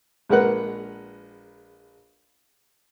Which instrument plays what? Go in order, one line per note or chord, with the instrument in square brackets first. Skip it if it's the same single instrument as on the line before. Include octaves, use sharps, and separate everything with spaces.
[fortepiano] A#1 G#3 A#4 B4 F#5 F#6